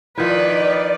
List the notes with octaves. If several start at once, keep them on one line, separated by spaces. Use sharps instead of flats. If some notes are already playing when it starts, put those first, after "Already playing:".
D#3 F3 E4 B4 D5